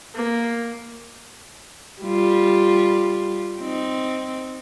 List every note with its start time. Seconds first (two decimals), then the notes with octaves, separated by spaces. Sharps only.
0.15 A#3
2.02 G3 F4
3.59 C4 D#4